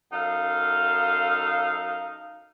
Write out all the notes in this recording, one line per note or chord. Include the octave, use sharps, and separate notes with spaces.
F#2 D#4 A4 F5